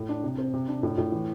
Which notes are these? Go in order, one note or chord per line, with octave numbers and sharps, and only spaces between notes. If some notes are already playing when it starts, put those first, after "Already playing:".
Already playing: A2
D4
C3
C4
C3
D4
A2
A2
E3